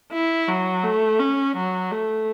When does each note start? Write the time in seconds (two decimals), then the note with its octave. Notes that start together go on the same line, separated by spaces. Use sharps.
0.13 E4
0.48 F#3
0.84 A3
1.20 C#4
1.56 F#3
1.92 A3